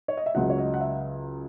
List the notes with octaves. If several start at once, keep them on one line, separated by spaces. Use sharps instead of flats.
C#5
D#5
E5
C#2 C#3 F#3 F#5
C#5
D#5
F#5
E5